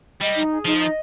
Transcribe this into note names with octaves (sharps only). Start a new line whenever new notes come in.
G3 D#5
D#4
G#4
F3 D#4
D#5